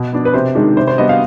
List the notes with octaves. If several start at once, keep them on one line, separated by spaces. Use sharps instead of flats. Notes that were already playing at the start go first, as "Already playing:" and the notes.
Already playing: B2
B3 D4
B4
C3 C5
D#3 G#3 D4
C3 C5
C5
G3 B3 D4 D#5
F5